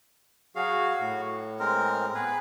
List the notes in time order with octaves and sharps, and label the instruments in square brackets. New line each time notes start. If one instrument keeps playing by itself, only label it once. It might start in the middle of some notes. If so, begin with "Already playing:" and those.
[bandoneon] F#3 G#4 F5 [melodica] F#4
[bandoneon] A2
[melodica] G#3 C4 A#4
[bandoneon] B3 [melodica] G#4 B4